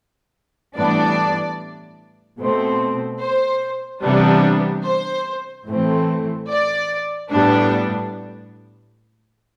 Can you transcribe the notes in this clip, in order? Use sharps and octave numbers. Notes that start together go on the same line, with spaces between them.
A2 E3 G3 B3 D4 D5
B2 A3 C4
C5
C3 E3 G3 B3 D4
C5
A2 E3 A3 C4
D5
A2 G3 B3 D4